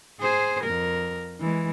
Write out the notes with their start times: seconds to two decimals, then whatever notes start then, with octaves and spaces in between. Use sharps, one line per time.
0.20 G#4 C5
0.63 F2 A#4
1.40 E3 G#3